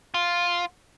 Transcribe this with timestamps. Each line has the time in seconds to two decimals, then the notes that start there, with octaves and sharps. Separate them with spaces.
0.14 F4